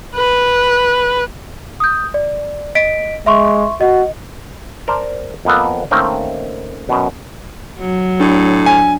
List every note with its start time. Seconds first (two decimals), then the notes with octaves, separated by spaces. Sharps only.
0.15 B4
1.80 D#6 G6
2.14 D5
2.75 D#5 B6 D7
3.26 G#3 E5 C6 C#6
3.81 F#4 D#5
4.88 A#4 C5 D5 A5
5.45 F2 A#3 B3 A4
5.91 D#3 A3 A#3 C4 C#4 D#4
6.89 F#2 B2
7.79 F#3
8.20 A2 D4
8.66 G#5